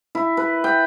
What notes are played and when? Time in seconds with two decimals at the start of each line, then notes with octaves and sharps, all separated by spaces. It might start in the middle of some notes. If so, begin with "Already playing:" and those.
0.15 E4
0.37 B4
0.64 G5